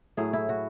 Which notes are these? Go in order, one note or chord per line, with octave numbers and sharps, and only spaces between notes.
A2 F#3 A3 G#4
E4
F#4